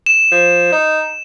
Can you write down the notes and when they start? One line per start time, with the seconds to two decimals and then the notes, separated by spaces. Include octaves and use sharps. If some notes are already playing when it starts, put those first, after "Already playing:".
0.06 E7
0.32 F3
0.72 D#4